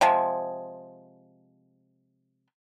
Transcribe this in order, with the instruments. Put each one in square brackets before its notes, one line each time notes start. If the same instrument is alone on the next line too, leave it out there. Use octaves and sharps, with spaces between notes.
[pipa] C3 F3 G#3